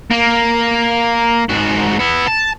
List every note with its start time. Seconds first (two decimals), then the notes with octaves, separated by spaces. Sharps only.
0.11 A#3
1.49 G#2 F#4
1.99 B3 E4
2.28 A5